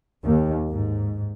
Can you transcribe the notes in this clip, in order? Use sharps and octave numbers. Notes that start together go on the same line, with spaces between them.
D#2
G#2